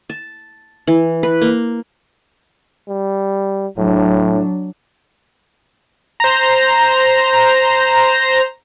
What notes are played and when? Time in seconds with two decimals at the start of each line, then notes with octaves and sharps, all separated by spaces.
0.10 A5
0.87 E3
1.23 B4
1.42 A#3
2.88 G3
3.77 A2 F#3 D4
6.20 C5 A#5